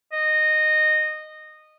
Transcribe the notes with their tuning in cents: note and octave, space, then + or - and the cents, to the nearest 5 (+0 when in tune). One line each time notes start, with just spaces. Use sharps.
D#5 -15